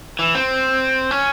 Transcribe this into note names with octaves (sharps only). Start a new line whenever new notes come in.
E3
C4
C#4